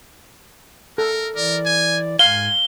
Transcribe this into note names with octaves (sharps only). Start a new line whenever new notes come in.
A4 A#4
E3 A#4 D5
G#5
G#2 F5 G#5 G7